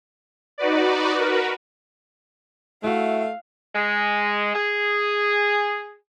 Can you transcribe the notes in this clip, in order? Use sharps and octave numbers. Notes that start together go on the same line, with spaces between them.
D#4 F#4 B4 D5
F#4 A#4 B4
A3 E4 F#4 F5
G#3
G#4